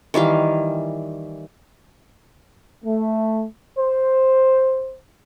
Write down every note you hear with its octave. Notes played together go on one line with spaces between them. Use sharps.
D#3 E3 G3 F5
A3
C5